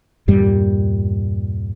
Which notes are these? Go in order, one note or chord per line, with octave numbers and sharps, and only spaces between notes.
E2 G2 A#2 G3